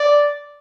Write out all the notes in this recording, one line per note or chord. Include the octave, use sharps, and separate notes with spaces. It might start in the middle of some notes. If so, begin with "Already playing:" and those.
Already playing: D5